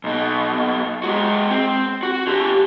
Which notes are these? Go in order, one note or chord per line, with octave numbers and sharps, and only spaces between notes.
B1 B2
G#3 F#4
C4
F#4
D3 G4